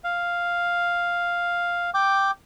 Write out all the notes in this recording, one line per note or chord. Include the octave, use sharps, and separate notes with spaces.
F5
G5 D6